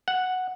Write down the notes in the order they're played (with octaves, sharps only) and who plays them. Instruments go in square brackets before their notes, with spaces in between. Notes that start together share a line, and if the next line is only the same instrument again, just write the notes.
[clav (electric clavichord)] F#5